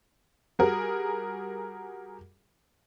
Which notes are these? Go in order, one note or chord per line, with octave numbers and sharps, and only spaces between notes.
G3 F#4 G#4 A#4